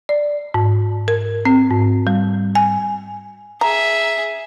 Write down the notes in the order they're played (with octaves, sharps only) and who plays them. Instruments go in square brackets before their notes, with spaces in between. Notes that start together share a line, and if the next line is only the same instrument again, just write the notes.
[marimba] D5
G#2
A#4
C4
G#2
G3
G#5
[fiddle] G#4 E5 [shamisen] A#5